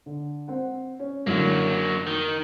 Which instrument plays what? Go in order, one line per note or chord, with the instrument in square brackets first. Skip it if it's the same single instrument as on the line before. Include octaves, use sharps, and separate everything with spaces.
[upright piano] D3
C4 F#5
C#4
[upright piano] F#2 A2 D3 [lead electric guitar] F#3 A#3
[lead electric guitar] D#3